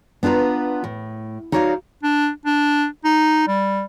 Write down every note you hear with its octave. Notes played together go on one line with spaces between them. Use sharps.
B3 D4 F4 B4 A#5
A2
D#4 F#4 A#4 C#5 D5 F5
D4
D4
D#4
G3